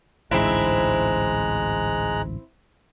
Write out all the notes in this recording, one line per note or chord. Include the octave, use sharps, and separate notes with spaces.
A1 D2 G#2 G#3 C4 E4 A#5 F#6